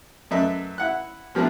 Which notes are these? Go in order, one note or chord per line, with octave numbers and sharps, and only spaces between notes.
F#2 A3 B4 D#5 E5
E4 F#5 F#6
F3 G3 A#3 B3 D4 E4